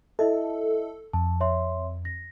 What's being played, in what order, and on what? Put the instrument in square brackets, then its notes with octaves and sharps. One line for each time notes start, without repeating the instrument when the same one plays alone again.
[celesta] E4 D#5 E5 [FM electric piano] A4
[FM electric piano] F2 [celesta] A5
[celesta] C#5 E5 C6
A#6